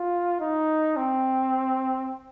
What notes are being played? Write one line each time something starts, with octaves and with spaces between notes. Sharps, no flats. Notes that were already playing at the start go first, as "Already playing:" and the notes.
Already playing: F4
D#4
C4